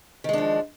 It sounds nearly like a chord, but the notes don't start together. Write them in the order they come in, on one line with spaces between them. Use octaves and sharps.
D#3 G#3 D4 F3